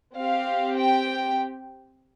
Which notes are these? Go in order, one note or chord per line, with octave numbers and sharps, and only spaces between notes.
C4 G4 F5
G5